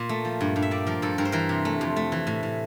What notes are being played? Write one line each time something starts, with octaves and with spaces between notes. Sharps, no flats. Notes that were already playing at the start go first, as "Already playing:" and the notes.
Already playing: A#2
A3
F3
G2
G2
E5
A#3 D5
F3 A#4
G2 A4
G2 A#4
C5
E3 A#4
C3
A3
F2
A3
E3
A2
A2